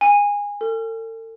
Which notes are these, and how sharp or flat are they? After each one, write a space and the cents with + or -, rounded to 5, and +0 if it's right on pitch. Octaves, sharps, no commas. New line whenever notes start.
G#5 -25
A4 +45